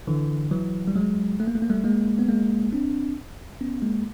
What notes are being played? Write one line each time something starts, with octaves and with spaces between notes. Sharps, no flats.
D3 E3
E3 F#3
G3
F#3 G#3
A3
A#3
A3
A#3
G3 A3
G#3 A#3
B3
G#3 A#3
C4 D4
B3 C#4
G#3 A#3